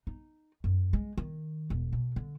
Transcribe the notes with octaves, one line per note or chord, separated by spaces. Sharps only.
D#4
F#2
G#3
D#3
E1
B2
D3